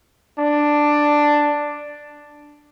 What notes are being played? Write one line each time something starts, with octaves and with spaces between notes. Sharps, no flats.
D4